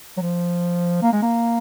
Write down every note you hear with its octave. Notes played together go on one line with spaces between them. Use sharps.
F#3
F3
A#3
G#3
A#3